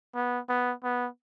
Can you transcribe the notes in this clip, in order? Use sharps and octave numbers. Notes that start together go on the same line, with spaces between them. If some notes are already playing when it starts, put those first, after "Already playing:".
B3
B3
B3